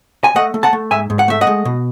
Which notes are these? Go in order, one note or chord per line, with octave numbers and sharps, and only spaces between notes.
G#5
A3 D#5 F#5
A3
F#5 A5
A3
G#2 E5 G#5
G#2
F#5
A3 E5
D#5 F#5
G#3
B2